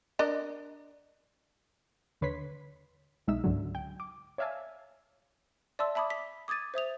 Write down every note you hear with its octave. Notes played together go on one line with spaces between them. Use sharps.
D4 A#4 D#5
D#2 D3 B4 C#5 C6 B6
B1 G#3 D#4 E5 E6
C#2 G#2 D3 F#3
G5
D6
C#5 D5 E5 F5 G#5 A5
D5 E5 A5 C6 E6
E5 A5 B5 D6 D#6
B6
D6 D#6 G#6 A6 D#7
C5 E5 D#6 F7